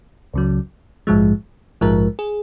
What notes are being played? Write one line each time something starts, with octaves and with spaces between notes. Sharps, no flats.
C#2 C#3 F#3
A#1 G#2 F3 G#3
A#1 G#2 F3 G#3 A#4
G#4